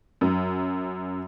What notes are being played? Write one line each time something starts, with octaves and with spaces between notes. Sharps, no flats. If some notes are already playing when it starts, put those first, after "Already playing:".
F#2